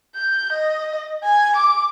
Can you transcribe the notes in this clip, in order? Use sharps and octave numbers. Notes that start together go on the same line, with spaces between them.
G6
D#5
G#5
D6